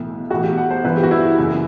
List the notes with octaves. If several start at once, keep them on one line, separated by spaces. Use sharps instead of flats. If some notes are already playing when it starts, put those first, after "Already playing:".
Already playing: B1 A2 E3
B1 A2 E3 F#4
G4
F#5
C5
G1 G2 E3 B4
G4
F#4
E4
F#1 F#2 E3